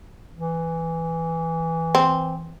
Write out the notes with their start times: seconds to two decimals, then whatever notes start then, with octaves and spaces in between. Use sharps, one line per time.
0.35 E3
1.95 C4